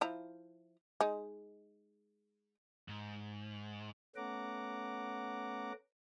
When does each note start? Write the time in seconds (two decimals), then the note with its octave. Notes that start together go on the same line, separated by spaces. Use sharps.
0.01 F3 E4 A#5
1.01 G#3 D#4
2.88 G#2
4.16 A3 B3 C#4 F#5 A#5 D6